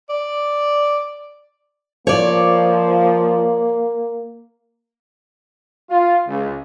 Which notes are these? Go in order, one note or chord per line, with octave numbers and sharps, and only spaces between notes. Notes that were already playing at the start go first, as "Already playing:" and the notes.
D5
F3 A#3 C#5 D5
F4
C#2